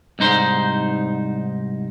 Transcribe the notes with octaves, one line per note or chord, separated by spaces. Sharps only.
C2 G#2 D#4 C5